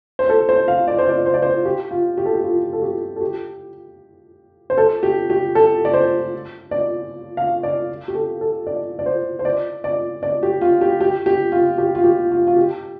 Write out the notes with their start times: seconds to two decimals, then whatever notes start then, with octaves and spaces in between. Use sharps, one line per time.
0.19 C5
0.30 A4
0.49 C5
0.68 F5
0.87 D5
0.99 C5
1.09 D5
1.26 C5
1.34 D5
1.42 C5
1.65 G4
1.91 F4
2.18 G4
2.26 A4
2.34 G4
2.44 F4
2.73 A4
2.82 G4
3.16 A4
3.21 G4
4.70 C5
4.78 A4
5.03 G4
5.30 G4
5.55 A4
5.85 D5
5.94 C5
6.71 D5
7.37 F5
7.63 D5
8.08 G4
8.15 A4
8.41 A4
8.67 D5
8.99 D5
9.06 C5
9.39 C5
9.45 D5
9.84 D5
10.23 D5
10.43 G4
10.61 F4
10.81 G4
11.01 G4
11.26 G4
11.52 F4
11.78 G4
11.95 F4
12.04 G4
12.31 F4
12.47 F4
12.56 G4